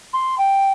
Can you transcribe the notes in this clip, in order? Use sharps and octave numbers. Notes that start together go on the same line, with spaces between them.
C6
G5